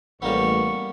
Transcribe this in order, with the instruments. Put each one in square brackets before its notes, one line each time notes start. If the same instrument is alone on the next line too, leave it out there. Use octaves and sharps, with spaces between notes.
[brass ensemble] A1 [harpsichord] G3 A#3 B3 [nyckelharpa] C#6